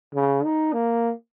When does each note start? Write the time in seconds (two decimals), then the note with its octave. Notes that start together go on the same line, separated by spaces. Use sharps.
0.15 C#3
0.44 D#4
0.73 A#3